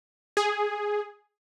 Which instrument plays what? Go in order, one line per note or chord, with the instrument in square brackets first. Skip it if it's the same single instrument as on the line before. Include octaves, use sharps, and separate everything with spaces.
[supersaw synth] G#4